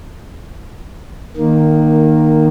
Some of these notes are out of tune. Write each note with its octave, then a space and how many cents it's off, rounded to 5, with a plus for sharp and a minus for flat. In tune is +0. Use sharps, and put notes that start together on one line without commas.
D#3 -15 A#3 +0